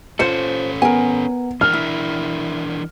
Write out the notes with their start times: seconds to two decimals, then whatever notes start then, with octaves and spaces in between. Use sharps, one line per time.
0.19 C#4 F4 A4 C5 C#7
0.82 B3 A#4 G#5
1.61 E3 D4 A#4 F6
1.73 E4